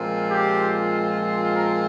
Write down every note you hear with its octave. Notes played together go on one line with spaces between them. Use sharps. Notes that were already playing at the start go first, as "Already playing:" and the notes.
Already playing: A#2 F3 G#3 C4 F4
G4
A#4